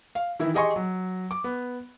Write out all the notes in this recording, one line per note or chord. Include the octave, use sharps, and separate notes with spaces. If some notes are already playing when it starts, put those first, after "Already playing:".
F5
D#3 E3 E4
G4 G#4 D#5 G#5 C6 C#6
F#3
D6
B3